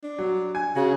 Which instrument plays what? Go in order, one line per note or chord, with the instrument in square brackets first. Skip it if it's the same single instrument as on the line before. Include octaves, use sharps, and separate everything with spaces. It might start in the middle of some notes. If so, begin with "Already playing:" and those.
[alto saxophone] D4
[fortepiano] F#3
G#5
[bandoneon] C#3 [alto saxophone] F#4